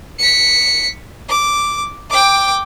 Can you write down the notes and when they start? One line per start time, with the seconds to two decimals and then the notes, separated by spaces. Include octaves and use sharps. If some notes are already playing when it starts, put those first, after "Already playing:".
0.19 B6 C#7
1.29 D6
2.10 G5 D6